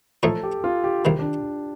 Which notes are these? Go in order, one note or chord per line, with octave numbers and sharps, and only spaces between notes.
A2 F3 A3 D#4 A4
G4
F4
G4
C2 C3 D#3 G4
D4